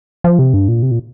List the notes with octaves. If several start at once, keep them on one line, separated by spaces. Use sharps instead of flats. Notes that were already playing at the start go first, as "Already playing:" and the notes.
F3
C3
G2
A#2
C3
A#2